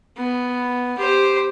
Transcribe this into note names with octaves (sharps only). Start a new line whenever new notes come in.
B3
G4 C5